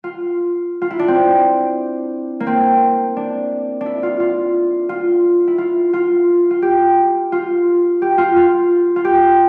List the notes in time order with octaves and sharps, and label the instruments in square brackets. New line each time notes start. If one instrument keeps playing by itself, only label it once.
[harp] F4
F4
E4
D4
C4
A#3
C4
D4
D4
E4
F4
F4
F4
E4
F4
F4
F4
G4
F4
G4
F4
F4
F4
G4